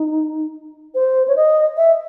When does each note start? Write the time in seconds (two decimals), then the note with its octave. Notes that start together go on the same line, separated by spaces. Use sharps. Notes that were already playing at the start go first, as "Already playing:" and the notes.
Already playing: D#4
0.95 C5
1.28 C#5
1.36 D#5
1.77 E5